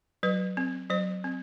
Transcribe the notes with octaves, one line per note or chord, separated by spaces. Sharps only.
F#3 B4
C4
F#3 C5
C4